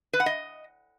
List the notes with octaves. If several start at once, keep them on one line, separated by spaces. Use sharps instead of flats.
B4
F#5
D#5